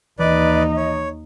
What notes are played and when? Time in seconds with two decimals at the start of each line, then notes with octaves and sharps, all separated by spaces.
0.19 D#2 E3 D#4 B4 D5 D#5
0.77 C#5